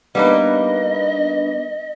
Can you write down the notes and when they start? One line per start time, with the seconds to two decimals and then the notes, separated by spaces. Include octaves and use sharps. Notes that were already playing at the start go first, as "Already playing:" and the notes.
0.15 G3 A#3 B3 D4 D#4 B4 D#5